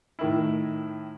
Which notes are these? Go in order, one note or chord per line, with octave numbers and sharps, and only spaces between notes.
A2 D#3 E4